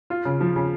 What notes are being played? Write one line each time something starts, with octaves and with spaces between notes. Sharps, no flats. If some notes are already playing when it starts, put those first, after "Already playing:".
F4
C#3
F3
C#3